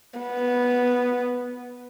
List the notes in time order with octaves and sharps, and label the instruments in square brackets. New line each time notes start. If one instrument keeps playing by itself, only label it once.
[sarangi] B3